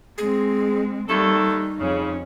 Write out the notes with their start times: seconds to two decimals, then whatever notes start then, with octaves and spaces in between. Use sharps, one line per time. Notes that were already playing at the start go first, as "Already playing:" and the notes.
0.18 G#3 C4 G#4
1.09 D#2 G3 A3 D#4 A4
1.80 F2 C#3 C#4